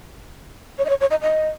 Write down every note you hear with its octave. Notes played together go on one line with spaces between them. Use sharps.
C#5
D#5
C#5
C#5
D#5
D#5